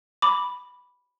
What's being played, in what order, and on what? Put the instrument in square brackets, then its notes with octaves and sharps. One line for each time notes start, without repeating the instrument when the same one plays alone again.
[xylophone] B5 D6